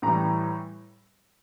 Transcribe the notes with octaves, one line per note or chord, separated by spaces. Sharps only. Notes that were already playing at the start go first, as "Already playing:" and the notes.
A2 E3 G3 A#5